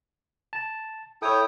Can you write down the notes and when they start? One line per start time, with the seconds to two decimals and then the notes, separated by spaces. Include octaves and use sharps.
0.53 A5
1.22 E4 A4 C#5 G5 D#6